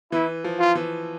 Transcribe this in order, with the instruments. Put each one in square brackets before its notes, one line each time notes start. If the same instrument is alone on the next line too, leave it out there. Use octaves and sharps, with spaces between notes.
[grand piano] E3 [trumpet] E4
[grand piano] F3
[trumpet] F4
[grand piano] E3